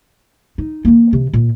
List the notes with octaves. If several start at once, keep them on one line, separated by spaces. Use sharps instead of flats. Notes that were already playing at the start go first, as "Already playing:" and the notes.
D#4
E3 A#3
C3
A#2